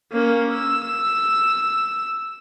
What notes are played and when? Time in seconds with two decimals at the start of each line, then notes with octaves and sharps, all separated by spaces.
0.12 A#3 C#4
0.51 E6